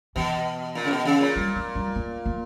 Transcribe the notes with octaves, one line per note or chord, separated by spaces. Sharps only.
B2 E3
A#2
C#3
B2
C#3
A#2
G3
A#3
G3
A#3
A#3